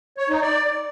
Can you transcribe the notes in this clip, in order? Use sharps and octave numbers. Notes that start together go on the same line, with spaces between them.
C#5
D#4
D5